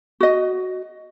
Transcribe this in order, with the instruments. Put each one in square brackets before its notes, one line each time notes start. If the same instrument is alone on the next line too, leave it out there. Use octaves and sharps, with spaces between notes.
[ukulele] F#4 D#5